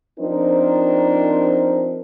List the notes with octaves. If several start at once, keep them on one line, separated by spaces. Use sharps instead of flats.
F3 C4 D4 D#4 A#4 C5